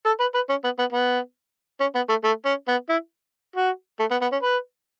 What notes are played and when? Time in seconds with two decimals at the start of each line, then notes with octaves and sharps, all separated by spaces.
0.06 A4
0.20 B4
0.35 B4
0.49 C#4
0.64 B3
0.79 B3
0.92 B3
1.80 C#4
1.95 B3
2.09 A3
2.24 A3
2.46 C#4
2.68 B3
2.89 E4
3.56 F#4
4.00 A3
4.11 B3
4.22 B3
4.32 C#4
4.43 B4